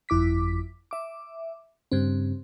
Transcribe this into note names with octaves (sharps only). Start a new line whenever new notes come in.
G1 F2 E4 D6 B6
E5 D6
G2 C#3 C4